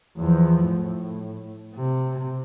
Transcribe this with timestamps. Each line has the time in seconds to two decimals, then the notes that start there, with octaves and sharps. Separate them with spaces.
0.17 E2 F3
0.65 A2
1.75 C3